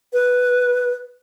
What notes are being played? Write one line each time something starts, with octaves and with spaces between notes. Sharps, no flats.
B4